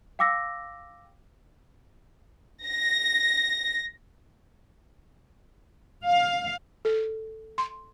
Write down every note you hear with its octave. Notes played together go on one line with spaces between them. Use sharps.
F5 G5 D6 E6 A#6
A#6
F5
A4
C6